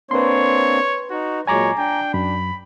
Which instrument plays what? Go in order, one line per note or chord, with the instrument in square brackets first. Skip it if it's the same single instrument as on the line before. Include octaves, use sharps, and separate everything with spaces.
[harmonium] A#3 C4 D4 [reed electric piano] B4 C6 [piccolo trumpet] C#5
[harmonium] D#4 [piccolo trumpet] F#4
[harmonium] A#2 F#3 G#3 [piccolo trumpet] C#5 [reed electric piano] G#5 A#5 D6
[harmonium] D4 [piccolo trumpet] G5
[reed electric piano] F#2 [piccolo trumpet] B5